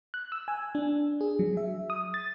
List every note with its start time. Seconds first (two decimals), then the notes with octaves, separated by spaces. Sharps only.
0.14 F#6
0.32 E6
0.48 G#5
0.75 D4
1.21 G#4
1.39 F#3
1.57 E5
1.90 D#6
2.14 A6